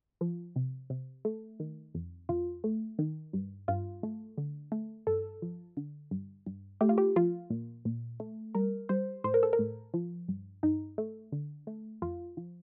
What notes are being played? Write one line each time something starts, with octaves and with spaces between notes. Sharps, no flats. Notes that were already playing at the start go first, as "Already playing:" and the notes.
F3
C3
C3
A3
D#3
F2
F2 F4
A3
D#3
G2
G2 F4
A3
D3
A3
G2 A4
F3
D3
G2
G2
A3 G4
F4
G4
F3 F4
A#2
A#2
A3
G3 A#4
G3 C5
A2 C5
A#4
A4
A#4
A2
F3
G2
G2 D#4
A3
D3
A3
F2 F4
F3